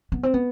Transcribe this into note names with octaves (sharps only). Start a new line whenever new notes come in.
B3
C4
B3